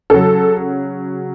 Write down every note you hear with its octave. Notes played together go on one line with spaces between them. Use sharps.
C#3 F#3 A4